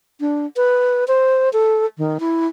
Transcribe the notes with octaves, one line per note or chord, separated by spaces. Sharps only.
D4
B4
C5
A4
D#3
E4